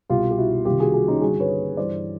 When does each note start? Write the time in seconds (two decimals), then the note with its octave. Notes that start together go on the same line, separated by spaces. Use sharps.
0.09 C2 B2 F4 G4
0.31 G4
0.38 E4 F#4
0.65 C2 C3 D#3 F4 G4
0.80 F#4 G#4
0.94 F#4 G#4
1.08 C#4 D#4
1.21 G2 D3 F#4 G#4
1.40 B4 C#5
1.77 G2 E3 C5 D5